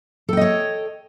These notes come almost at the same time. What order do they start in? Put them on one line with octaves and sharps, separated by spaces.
A4 G5 D#5 C#5